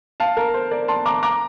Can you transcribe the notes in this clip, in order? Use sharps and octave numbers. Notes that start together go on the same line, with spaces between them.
F5 A5
A#4
C5
A#4 D5
A5 C6
A#5 D6
A#5 D6